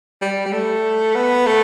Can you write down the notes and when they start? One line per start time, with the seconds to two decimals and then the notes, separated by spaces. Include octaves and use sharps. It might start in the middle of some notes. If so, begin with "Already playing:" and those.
0.22 G3
0.46 G3
0.53 A3
1.15 B3
1.47 A3